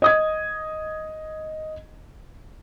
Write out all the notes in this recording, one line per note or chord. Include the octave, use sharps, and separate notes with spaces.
D#5 D#6 G#6